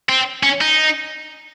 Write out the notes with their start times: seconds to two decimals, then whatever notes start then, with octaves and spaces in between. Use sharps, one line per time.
0.09 C4
0.43 C#4
0.61 D#4